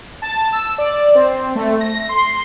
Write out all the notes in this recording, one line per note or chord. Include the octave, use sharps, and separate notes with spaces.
A5
E6
D5
C4
A3
A#6
C6